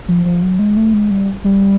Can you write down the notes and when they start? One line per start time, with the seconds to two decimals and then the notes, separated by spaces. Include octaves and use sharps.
0.08 F3
0.25 F3
0.42 F#3
0.59 G#3
0.76 A3
0.93 G#3
1.11 G3
1.44 G3